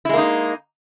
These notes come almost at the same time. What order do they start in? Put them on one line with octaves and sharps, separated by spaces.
E4 G#3 A#3 D#4